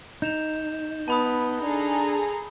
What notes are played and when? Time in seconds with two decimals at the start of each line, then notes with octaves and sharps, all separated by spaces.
0.22 D#4 G6 E7 F7
1.08 B3 A5 B5 D#6
1.62 D4 G#4 A4 A#5